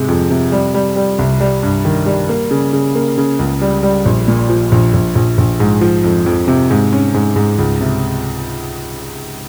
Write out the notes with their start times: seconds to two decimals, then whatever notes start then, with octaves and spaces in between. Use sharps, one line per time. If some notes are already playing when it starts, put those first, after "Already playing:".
Already playing: G#2 C3 G#3
0.08 F2
0.30 C3
0.52 G3
0.74 G3
0.96 G3
1.19 C2
1.41 G3
1.63 G2
1.85 D#3
2.06 G3
2.29 A#3
2.51 C#3
2.73 C#3
2.95 A#3
3.18 C#3
3.39 C#2
3.62 G3
3.83 G3
4.06 A#1
4.28 A#2
4.49 F3
4.72 A#1
4.94 A#1
5.15 A#1
5.38 A#1
5.60 G#2
5.81 F3
6.04 F2
6.26 F2
6.48 C3
6.70 G#2
6.93 C#4
7.14 G#2
7.36 G#2
7.58 C#2
7.81 C3